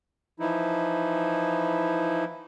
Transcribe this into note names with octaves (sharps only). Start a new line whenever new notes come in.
E3 F3 D#4 E4